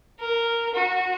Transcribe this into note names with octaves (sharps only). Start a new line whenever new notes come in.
A#4
F#4